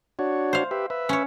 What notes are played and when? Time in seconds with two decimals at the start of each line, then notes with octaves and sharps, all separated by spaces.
0.19 D4 F#4 C#5
0.53 C5 F5
0.71 G4 B4 E5
0.90 B4 E5
1.09 C#4 C#5